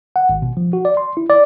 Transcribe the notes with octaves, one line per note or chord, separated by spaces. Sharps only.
F#5
G#1
B2
F3
F#4
D5
C6
E4
D5